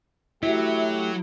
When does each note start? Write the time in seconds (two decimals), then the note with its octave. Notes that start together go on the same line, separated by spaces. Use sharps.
0.43 F#3 A3 E4 F#4 G4 E5